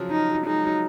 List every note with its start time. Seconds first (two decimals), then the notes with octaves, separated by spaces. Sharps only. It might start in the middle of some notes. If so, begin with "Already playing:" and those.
Already playing: C#3 F3 F#3
0.11 D#4
0.29 F#3
0.46 G#3 D#4
0.64 F#3